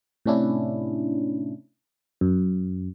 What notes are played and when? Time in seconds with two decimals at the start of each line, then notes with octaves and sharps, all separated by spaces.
0.26 A2 C3 C#4 D4 E4
2.21 F#2